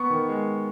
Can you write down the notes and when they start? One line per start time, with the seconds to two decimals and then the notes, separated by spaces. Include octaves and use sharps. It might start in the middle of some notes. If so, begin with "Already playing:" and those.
Already playing: B3 C#6
0.10 D#3
0.29 G#3